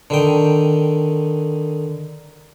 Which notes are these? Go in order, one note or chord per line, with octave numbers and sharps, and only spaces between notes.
D3 D#3 G5